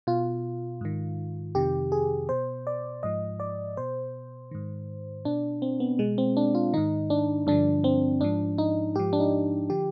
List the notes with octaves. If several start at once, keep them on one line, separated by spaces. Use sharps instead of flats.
B2 F4
G#2 D#3
F2 C3 D#3 G4
G#4
B2 C5
D5
G#2 F3 D#5
D5
B2 C5
G#2 D#3
B2 D4
C4
B3
B2 G#3
C4
D4
F4
G#2 D#3 D#4
D4
G2 D3 F3 D4
C4
G#2 F3 D4
D#4
G#2 F3 G4
D4
D#4
D3 F3 G4